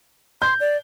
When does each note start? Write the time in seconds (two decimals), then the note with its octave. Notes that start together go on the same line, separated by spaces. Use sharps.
0.42 C6 G6
0.60 D5